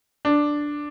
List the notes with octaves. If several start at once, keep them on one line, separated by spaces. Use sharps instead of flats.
D4